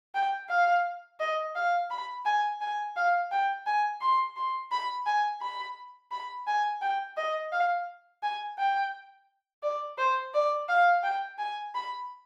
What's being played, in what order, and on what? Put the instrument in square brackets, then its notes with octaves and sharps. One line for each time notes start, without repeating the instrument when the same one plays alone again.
[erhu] G5
F5
D#5
F5
B5
G#5
G#5
F5
G5
G#5
C6
C6
B5
G#5
B5
B5
G#5
G5
D#5
F5
G#5
G5
D5
C5
D5
F5
G5
G#5
B5